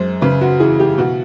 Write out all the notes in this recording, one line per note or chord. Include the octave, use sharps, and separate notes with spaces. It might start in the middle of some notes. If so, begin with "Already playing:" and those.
Already playing: F#2 G#3 C5
C#3 B4
F#4
E3 G#4
G4
B2 F#4